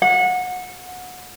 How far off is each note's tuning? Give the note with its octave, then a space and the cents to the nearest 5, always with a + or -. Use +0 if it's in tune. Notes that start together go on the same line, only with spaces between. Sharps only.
F#5 -25